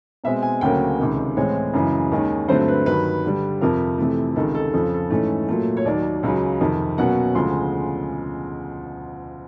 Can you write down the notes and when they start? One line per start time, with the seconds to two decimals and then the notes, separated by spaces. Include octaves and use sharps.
0.24 B2 G#3 C4 E5
0.43 G#5
0.61 D2 C#3 F#3 A#3 C#4 G5
0.99 C#2 C3 D#3
1.37 A2 E3 G#3 C4 C#5
1.73 F#2 C#3 E3 G#3
2.11 D#2 D#3 G#3 C#4
2.48 G2 D3 F#3 A3 C4 C5
2.68 B4
2.86 G2 D#3 F#3 B4
3.24 G2 D3 G3
3.61 F2 C3 F3 A#4
3.98 F2 C3 E3 A3
4.36 C#2 C3 D#3 A4
4.54 A4
4.73 F2 C#3 F3 A4
4.94 A4
5.10 G#2 E3 A3 C#4
5.49 A#2 F#3 A3
5.77 C#5
5.85 D#2 D#3 F#3 D5
6.23 C#2 C#3 F#3
6.60 F2 C3 D#3
6.98 B2 F#3 A#3 C#4 F#5
7.35 D2 C#3 F3 G#3 C6